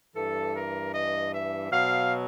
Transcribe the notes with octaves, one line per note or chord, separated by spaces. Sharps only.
G2 E3 A4
A#4
D#5
E5
B2 F#3 F5